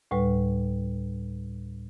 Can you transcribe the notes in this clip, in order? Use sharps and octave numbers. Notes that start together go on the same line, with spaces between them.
D2 A2 G3 B4